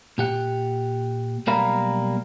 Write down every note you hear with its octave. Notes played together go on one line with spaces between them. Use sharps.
A#2 G4 F#5
B1 G3 A#3 A#4 F5 B5